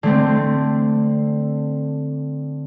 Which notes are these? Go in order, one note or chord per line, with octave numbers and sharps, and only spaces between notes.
D3 A3 C4